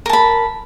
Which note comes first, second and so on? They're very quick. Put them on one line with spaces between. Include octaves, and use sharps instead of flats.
A#4 A5 B5